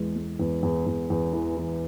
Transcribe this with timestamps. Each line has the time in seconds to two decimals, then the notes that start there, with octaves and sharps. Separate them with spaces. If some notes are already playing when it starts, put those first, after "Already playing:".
Already playing: E2 E3 G#3
0.16 G#3
0.39 E2
0.63 E2
0.86 E2
1.10 E2
1.33 E3
1.57 E3